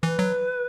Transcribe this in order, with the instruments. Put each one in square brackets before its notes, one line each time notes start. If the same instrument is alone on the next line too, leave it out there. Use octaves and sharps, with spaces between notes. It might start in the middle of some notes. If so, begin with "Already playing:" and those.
[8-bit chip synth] E3 [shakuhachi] B4
[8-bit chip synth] F#3